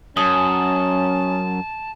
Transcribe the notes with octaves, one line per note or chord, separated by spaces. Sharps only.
F#2 C#4 A5 D#6